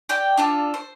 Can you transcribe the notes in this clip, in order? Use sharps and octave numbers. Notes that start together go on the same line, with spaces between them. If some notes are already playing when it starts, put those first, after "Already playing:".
G4 D5 G5
D4 F4 A4
C5